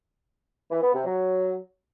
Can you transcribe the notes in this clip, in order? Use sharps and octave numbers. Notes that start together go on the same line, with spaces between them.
E3
B3
C3
F#3